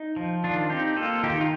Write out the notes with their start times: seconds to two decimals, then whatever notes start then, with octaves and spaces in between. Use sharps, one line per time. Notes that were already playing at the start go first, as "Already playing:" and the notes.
Already playing: D#4
0.16 F3
0.44 D#3 D4 F4
0.70 C4 D#4 G4
0.96 A#3 F4 A4
1.23 D#3 D#4 G4
1.41 F4